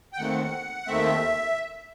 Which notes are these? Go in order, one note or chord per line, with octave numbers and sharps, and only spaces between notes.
G5
D#2 D#3 A3 C4 F#5
D#2 D#3 A3 C4 E5